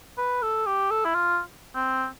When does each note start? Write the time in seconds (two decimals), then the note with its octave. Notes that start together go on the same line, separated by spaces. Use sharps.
0.18 B4
0.42 A4
0.66 G4
0.91 A4
1.05 E4
1.15 F4
1.75 C4